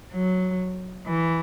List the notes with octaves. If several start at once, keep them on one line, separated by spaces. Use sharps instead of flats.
F#3
E3